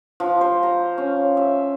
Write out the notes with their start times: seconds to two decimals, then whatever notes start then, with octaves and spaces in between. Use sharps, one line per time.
0.20 F3
0.41 C5
0.63 A#5
0.98 C#4
1.37 E5